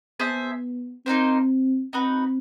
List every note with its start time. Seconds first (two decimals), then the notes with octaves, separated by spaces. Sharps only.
0.20 B3 G#4 C5 E5 A5
1.06 A#3 C4 D#4 G4 C5
1.93 C4 D#4 F#4 B4